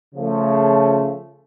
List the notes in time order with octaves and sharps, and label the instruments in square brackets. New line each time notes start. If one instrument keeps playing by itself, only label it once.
[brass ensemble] C#3 F3 A3